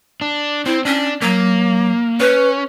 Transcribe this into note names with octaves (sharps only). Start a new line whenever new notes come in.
D4
C4 E4
C#4 D4
F#3 A#3
C#4 B4